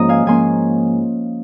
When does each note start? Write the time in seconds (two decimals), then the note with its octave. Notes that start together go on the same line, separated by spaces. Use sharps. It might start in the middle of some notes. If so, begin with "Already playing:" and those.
Already playing: G#2 F3 A#3 C#4 F4 D#5 A#5
0.09 F5 G#5
0.26 G#2 F3 A#3 C#4 F4 G#5 C6